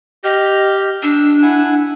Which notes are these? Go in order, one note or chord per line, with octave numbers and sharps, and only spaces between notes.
G4 D#5 F6 G6
D4 E6
E4 F#5 G#5